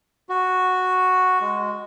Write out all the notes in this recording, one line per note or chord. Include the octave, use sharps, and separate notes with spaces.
F#4
G#3